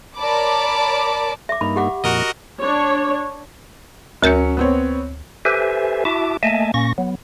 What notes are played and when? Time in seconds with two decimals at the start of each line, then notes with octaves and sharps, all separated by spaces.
0.18 A#4 C#5 D5 A5 B5 D6
1.49 E5 D6
1.61 G2 A#3 D#4 B5
1.76 G4 F#5 D6
2.04 F2 A#2 F#4 A#4 D#5
2.61 D4 C#5
4.22 D2 F#3 C#4 A#4 G6 C#7
4.57 B3 C4 C#5
5.45 G4 A4 B4 C5 E5 G#5
6.05 E4 F#4 E5 A5 D6
6.43 A3 A#3 D#5 E5 G#5 A5
6.74 A#2 A#3 C#4 C#6 A#6
6.98 F#3 B3